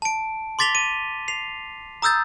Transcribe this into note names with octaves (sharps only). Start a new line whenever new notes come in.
A5 D7
C6 D6 A6 B6 F7 G7
D#7
C7 F7
A#5 D#6 E6 G6 A6